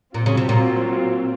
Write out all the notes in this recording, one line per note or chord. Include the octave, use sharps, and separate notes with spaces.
A#2 F#3 C4 F4
C#3
C3
A#2